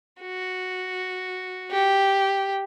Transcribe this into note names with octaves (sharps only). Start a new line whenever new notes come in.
F#4
G4